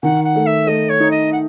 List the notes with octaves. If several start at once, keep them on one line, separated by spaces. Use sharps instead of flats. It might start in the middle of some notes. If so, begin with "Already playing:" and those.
D#3 F#5
F#5
A3
E5
A3 D#5
C#5
D#4
D#5
F#5